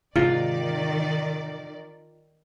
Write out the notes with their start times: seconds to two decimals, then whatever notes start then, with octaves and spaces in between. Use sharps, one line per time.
0.16 G#2 C3 D#3 F4 D5